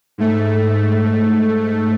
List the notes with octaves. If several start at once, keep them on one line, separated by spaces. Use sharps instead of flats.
G#2 A3